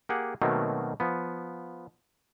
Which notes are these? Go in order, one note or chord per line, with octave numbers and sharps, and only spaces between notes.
A#3 G4 G#4 F#5
B2 D#3 F#3 A3 A#3 C4
F3 B3